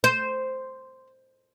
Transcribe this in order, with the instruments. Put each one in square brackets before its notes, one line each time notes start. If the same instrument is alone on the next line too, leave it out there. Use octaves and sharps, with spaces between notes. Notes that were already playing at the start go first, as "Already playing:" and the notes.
[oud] C5